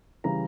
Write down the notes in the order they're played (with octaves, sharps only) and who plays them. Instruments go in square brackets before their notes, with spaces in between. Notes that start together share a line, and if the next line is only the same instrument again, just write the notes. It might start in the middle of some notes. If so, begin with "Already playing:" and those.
[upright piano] C#3 E3 G3 A#5